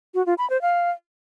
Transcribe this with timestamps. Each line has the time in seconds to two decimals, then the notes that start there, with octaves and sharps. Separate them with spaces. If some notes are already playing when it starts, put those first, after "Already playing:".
0.15 F#4
0.26 F4
0.38 B5
0.50 C5
0.62 F5